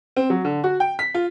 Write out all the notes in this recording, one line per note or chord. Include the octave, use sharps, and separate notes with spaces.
C4
F#3
D3
F#4
G5
B6
F4